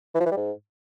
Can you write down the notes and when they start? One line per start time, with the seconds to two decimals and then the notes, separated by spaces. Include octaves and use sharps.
0.15 E3
0.20 F3
0.26 E3
0.31 G3
0.37 G#2